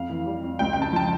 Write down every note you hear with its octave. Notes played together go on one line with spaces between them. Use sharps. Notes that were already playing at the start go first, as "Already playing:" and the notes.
Already playing: F2 F5
E3
G3
F2
C#2 G5
C#3 G5
A5
F3 A5